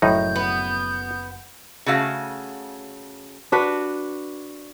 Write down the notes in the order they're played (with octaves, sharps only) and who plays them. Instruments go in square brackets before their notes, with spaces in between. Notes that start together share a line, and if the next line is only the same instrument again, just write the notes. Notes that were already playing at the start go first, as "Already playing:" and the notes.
[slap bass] F#1 F#2 F3 [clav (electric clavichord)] A2 D#4 [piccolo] G6
[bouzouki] B3
[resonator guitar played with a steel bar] C#3 A3 F#4 F5
[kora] D4 F#4 B4